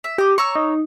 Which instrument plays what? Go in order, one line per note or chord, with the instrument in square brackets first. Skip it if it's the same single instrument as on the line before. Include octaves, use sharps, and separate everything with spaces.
[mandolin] E5
[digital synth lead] G4 [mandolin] D#5 D6
[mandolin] C#5 A#5 E6 [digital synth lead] C#6
[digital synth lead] D#4